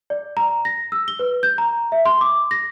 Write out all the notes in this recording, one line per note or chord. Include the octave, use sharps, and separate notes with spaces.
D5
A#5
A#6
E6
G7
B4
G6
A#5
E5
C6
D6
A#6